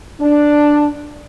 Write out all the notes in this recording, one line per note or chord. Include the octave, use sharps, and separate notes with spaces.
D4